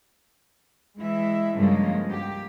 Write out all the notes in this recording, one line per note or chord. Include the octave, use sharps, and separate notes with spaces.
E3 G#3 E4 E5
G2 C#3 F3 G#3 A#3
A#3 G4